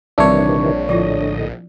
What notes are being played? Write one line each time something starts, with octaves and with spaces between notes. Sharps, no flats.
A#1 C3 D#3 E3 G3 C4 D4 C#5
A2 D3 F3 E4 F4 D#5